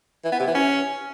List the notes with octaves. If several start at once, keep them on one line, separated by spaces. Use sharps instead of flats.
E3
B3
C3
E3
C#4